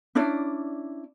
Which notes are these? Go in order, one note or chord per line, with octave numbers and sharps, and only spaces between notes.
C#4 D4 E4 D5